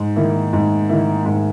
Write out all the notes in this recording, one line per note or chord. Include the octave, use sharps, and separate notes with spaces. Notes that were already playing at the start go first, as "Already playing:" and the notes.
Already playing: G#2
D#3 A#3 E4
G#2
D#3 A#3 E4
G#2